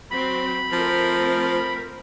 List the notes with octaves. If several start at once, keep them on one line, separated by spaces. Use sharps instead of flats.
F#3 C4 B5
F3 A3 C4 A#4